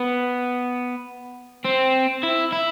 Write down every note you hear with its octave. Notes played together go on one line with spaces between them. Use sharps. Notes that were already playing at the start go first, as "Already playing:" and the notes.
Already playing: B3
C4
E4
E4